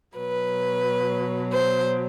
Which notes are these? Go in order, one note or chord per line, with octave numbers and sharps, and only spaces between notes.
B2 F#3 B4
C5